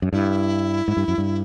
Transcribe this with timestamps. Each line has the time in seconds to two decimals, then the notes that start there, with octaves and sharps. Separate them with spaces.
0.02 F#2
0.13 G2 E4
0.88 G#2
0.97 G2
1.08 F#2
1.18 G2